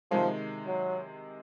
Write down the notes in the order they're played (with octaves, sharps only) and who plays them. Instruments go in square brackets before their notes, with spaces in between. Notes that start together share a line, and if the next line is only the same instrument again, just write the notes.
[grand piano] C3 D#3 G#3 [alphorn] F3
[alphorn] F#3